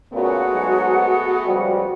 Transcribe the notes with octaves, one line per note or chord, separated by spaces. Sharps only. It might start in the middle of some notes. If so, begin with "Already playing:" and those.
A#2 C#3 A3 B3 F#4 G#4 F#5
G#2 F#3
C#2 F3 G3